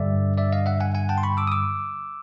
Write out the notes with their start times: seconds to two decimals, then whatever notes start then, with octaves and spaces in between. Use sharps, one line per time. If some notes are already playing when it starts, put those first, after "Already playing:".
Already playing: G2 D3 G3 D5 E5
0.38 D5 E5
0.53 D#5 F5
0.66 E5 F#5
0.80 F#5 G#5
0.95 F#5 G#5
1.09 G5 A5
1.18 C6
1.23 B5 C#6
1.37 D6 E6
1.47 D#6
1.52 D6 E6